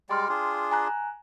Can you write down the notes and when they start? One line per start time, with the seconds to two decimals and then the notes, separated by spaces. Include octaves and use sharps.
0.09 G3 G#3 D5 G5 C6 F6
0.29 D4 F4 G#4
0.72 G#5 A#5 F#6